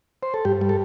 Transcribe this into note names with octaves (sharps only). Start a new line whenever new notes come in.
C5
A4
G2 G4
G3
A4